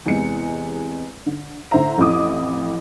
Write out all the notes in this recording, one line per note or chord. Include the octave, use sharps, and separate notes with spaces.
E2 C3 G#3 C#7
D3
A2 D3 C5 E5 A#5
A1 F2 E4 D6 D#6